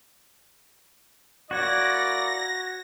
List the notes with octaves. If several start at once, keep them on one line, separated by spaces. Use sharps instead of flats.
A#3 E4 F#4 C#5 D5 A#6